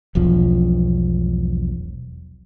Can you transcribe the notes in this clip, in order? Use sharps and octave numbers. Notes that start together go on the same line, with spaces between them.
E1 B1 F3